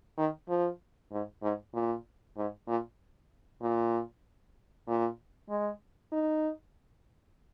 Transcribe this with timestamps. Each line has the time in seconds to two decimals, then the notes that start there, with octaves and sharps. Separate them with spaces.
0.18 D#3
0.48 F3
1.11 G#2
1.42 G#2
1.75 A#2
2.37 G#2
2.68 A#2
3.62 A#2
4.87 A#2
5.49 G#3
6.12 D#4